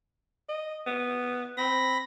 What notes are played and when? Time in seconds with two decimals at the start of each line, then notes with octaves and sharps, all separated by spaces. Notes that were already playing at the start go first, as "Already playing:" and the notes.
0.49 D#5
0.86 B3
1.57 C4 B5 A#6